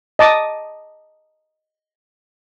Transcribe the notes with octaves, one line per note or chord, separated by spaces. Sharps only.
D#5 A5 D6